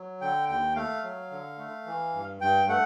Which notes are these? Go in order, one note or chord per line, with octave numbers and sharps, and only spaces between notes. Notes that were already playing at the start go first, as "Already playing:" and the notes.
Already playing: F#3
D3 G5
D#2 G5
A3 F5
F#3
D3
A3
E3
G2
G2 G5
A3 F#5